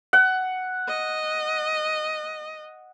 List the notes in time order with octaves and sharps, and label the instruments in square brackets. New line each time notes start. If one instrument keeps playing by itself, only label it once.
[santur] F#5
[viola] D#5